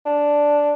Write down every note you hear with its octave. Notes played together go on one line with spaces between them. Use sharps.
D4